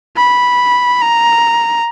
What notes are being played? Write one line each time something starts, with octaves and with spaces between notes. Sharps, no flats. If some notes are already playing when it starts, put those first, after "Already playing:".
B5
A#5